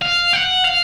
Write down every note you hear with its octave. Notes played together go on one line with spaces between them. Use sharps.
F5
F#5
F5